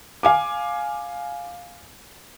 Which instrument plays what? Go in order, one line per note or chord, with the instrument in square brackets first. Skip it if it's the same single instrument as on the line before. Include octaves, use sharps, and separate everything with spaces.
[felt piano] F5 G#5 D6